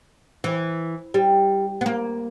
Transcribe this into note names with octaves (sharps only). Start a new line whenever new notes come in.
E3
G3
B3
A#3